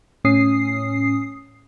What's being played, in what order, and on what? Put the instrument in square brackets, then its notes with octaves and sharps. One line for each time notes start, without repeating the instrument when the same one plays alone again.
[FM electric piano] A2 C#4 D#6 C7